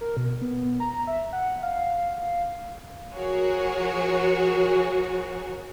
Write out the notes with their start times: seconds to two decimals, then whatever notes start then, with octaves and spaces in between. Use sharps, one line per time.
0.01 A#4
0.17 B2
0.42 B3
0.80 A#5
1.07 E5
1.33 F#5
1.63 F5
3.14 F3 F#4 G#4 A#4 C#5